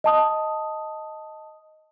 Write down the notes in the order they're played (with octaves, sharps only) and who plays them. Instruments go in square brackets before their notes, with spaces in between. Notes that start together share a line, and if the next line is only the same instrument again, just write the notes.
[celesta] D#5 A5 D#6